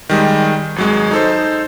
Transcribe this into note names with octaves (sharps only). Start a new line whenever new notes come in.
D#3 G3 G#3
G#1 F#3 G#3
D#4 A4 C5